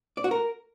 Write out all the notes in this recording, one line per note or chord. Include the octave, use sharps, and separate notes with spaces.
D5
F#4
A#4